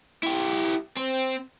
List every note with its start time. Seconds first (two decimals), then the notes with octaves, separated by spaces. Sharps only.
0.23 E4 G4
0.97 C4